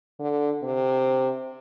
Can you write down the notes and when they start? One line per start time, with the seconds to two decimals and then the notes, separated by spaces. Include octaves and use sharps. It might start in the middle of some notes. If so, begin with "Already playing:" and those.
0.19 D3
0.63 C3